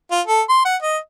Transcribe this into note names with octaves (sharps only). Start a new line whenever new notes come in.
F4
A4
C6
F#5
D#5